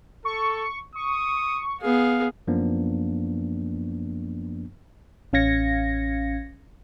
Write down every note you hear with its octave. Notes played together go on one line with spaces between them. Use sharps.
A4 C#6
C#6 D#6
B3 G#4 F5
F#2 F3 A#3 B3 D4
A1 C#4 F5 G#6 A#6 C#7